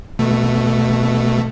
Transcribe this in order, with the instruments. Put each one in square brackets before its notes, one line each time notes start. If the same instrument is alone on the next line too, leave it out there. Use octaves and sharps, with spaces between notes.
[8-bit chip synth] B2 A3